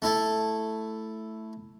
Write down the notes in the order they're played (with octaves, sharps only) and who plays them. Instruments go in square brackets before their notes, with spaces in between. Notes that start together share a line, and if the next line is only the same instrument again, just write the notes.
[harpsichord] A3 E4 A4